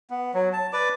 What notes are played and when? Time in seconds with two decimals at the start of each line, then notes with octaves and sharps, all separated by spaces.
0.10 B3
0.34 F#3
0.53 A5
0.73 B4 D5 D6